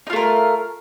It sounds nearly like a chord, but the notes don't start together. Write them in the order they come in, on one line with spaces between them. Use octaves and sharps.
D#4 F4 A3 A#4